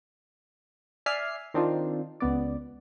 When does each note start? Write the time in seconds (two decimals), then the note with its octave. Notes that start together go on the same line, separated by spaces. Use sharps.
1.06 D5 E5 G#5 F6 C7
1.54 D#3 C4 D4 D#4 F4
2.20 C#2 B3 D5